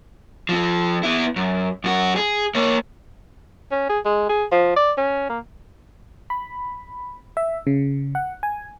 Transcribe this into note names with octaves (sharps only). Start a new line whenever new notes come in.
F3 C4
B3 E4
F#2
F#2 F#4
G#4
A#3 C#5
C#4
G#4
G#3
G#4
F3
D5
C#4
A#3
B5
E5
C#3
F#5
G#5